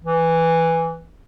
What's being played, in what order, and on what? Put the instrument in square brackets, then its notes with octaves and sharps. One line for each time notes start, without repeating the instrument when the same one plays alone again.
[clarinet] E3